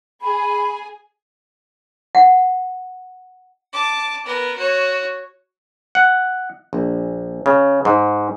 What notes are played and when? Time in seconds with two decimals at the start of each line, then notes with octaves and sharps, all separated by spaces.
0.22 G#4 G#5 B5
2.15 F#5
3.73 A5 D6
4.26 B3 A#4
4.56 F#4 C#5
5.95 F#5
6.73 A#1
7.46 C#3
7.85 G#2